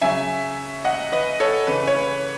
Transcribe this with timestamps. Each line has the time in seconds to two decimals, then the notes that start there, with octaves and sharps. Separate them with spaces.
0.01 C#3 F#3 E5 G#5
0.85 D#5 F#5
1.12 B4 D#5
1.40 A4 C#5
1.67 C#3 E3 B4
1.87 C#5
1.95 B4